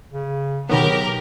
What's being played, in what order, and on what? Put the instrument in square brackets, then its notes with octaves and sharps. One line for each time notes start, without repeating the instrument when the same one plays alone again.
[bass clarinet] C#3
[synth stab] B2 D#3 B3 [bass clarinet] F#3 [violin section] G4 A#4